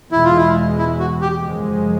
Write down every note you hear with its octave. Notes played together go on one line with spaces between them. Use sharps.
E2 B2 G#3 E4
F4
E4
E4
F#4
G4
F#2 C#3 F3 G#3